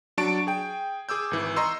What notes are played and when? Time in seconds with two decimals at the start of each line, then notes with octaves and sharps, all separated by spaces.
0.18 F#3 D4 A5 C#6 D7
0.47 G#4 G5
1.09 G#4 D6 E6 G6
1.31 G#1 E3
1.56 D#5 A#5 C6 C#6 E6